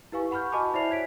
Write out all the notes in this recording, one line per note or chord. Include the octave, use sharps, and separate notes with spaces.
E4 G4 B4 F5 G#5 C#6
F#5 B5 C#6 F6 G6
F#4 D#5 G#5 A5 B5 D6
E4 C5 D5 E5 C7 F7
C#5 G#6 B6 D7